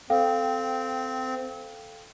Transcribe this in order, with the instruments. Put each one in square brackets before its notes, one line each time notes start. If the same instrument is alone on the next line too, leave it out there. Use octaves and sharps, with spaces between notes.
[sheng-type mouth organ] C4 [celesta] A4 F5 G5